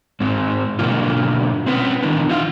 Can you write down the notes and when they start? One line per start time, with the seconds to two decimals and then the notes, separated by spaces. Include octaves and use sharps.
0.20 G#2 G#3 C4
0.79 B2 D3 F#3 A#3 F4
1.66 C4 C#4 B4
2.03 D#3 E3 B3 D4
2.29 D#4 F4 F5